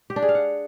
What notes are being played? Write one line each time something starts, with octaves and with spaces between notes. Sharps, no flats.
G4
D4
G#4
F5
F#5